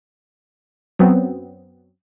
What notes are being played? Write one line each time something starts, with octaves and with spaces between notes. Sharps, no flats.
F#2 F#3 B3 C4